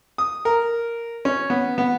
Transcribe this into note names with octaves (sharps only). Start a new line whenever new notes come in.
D#6
A#4
C#4
B3
B3